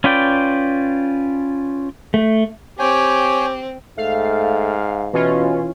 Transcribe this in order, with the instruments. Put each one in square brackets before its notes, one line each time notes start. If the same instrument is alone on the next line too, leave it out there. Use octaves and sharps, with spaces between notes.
[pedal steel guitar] C#4 F4 B4 D5 G5
[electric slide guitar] A3
[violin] C4 [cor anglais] G4 [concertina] C#5 G5 G#5
[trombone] G#2 [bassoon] A3 [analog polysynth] F5
[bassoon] B2 [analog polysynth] E3 C#4 F4